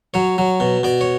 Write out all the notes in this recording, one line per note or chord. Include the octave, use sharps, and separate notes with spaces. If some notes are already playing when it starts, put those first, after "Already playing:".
F#3 C#5
F#3
B2
B2 D5
C#5